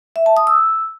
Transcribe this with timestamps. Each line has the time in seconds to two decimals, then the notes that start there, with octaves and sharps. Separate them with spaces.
0.16 E5
0.26 A5
0.37 D#6
0.47 E6